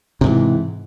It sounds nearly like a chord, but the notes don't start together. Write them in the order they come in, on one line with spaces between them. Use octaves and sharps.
C3 G#2 E3